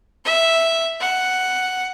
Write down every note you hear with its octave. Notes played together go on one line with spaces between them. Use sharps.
E5
F#5